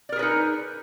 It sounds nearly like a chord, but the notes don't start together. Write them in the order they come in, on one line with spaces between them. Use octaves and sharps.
D5 A#4 G#4 B4 D#4